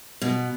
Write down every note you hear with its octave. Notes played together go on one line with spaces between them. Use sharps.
B2